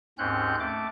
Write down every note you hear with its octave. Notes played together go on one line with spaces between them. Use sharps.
D#2 G#2 C4 C#4 F#6 G6
A3 D6